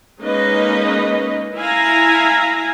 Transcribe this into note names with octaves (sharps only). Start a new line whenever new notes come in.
G#3 A#3 C#4 D#4 B4 D#5
E4 F5 G#5 A#5